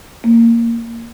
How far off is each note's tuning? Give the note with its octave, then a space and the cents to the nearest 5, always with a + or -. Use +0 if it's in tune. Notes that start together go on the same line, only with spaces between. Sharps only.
A#3 -10